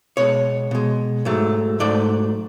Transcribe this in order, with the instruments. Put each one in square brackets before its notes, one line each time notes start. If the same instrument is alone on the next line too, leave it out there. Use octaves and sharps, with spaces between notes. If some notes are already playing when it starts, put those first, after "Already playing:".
[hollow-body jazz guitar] B2 G#3 C#5
B2 G#3
G#2 F#3 A3
G#2 F#3 A3 D5